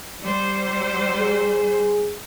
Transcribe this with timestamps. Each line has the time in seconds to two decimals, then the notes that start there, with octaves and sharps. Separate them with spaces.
0.21 G3 C5
1.20 G#4